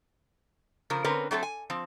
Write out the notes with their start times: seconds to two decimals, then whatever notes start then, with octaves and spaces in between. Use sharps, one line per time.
0.90 C#3 F3 A#4
1.05 D3 C4 C#4 A#4 B4
1.31 F#3 A3 C4 A4
1.43 G#5
1.70 F3 C4